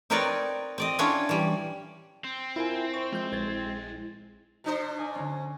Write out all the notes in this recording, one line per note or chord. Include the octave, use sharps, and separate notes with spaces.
C4 D#4 A#4 B4 C#5 D5
C4 D5 D#5
C#4 D4 E4 F4 C#5
E3 G3
C4
E4 F4 A#4 G#5
C5 C#6
F3 G#3 G6
A#1 G#6 A6
B2 D4 C5
G#6
D5 D#5 G#5
D3 C#4